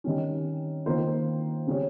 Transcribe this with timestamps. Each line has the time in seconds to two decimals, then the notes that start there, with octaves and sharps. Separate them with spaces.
0.04 D#3 G3 C#4
0.86 D#3 A#3 F4 C5
1.67 C#3 G3 C#4 G4 C#5